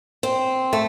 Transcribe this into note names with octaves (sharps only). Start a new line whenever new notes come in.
C4
A3